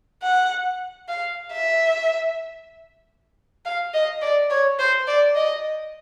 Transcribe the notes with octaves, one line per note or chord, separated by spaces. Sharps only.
F#5
F5
E5
F5
D#5
D5
C#5
C5
D5
D#5